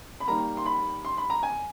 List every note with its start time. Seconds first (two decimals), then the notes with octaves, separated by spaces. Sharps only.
0.20 B5
0.27 D#3 G3 A#3 A#5
0.57 C6
0.66 B5
1.05 C6
1.17 B5
1.30 A#5
1.43 G#5